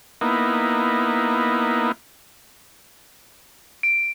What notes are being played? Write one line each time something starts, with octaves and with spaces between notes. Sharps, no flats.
A#3 B3 D#4 E4
D7